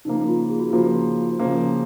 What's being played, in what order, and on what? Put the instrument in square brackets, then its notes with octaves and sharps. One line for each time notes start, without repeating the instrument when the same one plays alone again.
[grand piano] C#3 F3 A#3 [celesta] D#4
[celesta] F4
G#4
F#4
[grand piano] C#3 F3 A#3 [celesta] F4
[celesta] F#4
[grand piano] C#3 F3 A#3